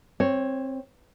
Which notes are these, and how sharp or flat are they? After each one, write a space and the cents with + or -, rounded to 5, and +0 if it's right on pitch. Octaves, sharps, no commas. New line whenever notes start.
C4 +15 C#5 -5